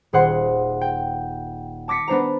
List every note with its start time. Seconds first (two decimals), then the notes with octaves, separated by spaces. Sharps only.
0.13 D#1 G#4 C5 F#5 C6
0.81 G5
1.88 A5 D6 A#6 B6 C#7
2.08 B3 D4 C5 A#5